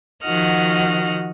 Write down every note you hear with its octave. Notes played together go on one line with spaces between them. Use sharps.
D#3 F3 F#4 D#5 F#5 F6